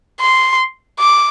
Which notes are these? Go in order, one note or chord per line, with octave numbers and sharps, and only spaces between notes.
C6
D6